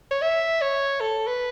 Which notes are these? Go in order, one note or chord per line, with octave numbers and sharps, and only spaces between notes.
C#5
E5
C#5
A4
B4